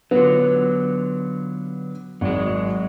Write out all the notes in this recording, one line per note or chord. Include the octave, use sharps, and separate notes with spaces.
D3 F#3 B3 F4
G#1 F#3 G#3